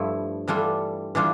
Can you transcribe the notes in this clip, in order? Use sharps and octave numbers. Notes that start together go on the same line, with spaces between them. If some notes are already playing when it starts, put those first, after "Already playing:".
Already playing: G2 F3 A3 E4
E3 G3 D4 F4 A4
E3 G3 D4 F4